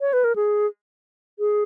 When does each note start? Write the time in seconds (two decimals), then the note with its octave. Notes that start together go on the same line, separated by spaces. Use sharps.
0.01 C#5
0.13 B4
0.24 A#4
0.36 G#4
1.39 G#4